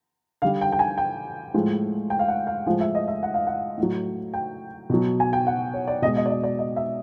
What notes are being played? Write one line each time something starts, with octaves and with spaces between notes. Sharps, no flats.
D3 G3 F5
G5
G5
G#5
G5
A2 F3 G#3
G5
F5
F#5
F5
A2 F3 G#3 F5
E5
D#5
E5
F#5
F5
F#5
A2
F#3
G5
B2 F#3
G#5
G5
F#5
C#5
D5
B2 G#3 D#5
D#5
D5
D#5
D5
D#5
E5